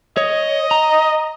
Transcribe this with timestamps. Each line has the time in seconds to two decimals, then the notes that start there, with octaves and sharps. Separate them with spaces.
0.17 C#5 D#5
0.71 A#5